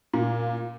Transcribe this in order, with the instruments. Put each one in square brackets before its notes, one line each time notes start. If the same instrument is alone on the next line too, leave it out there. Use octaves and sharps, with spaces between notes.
[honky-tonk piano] A#2